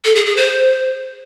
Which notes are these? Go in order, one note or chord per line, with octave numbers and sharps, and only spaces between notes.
A4
G#4
G#4
C5